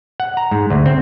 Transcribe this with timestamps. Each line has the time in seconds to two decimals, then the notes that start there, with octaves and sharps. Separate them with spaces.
0.20 F#5
0.37 A#5
0.51 G#2
0.70 D2
0.86 C4